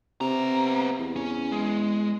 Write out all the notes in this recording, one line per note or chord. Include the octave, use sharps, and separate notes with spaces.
C3 B3 A#5
E2
C#4
G#3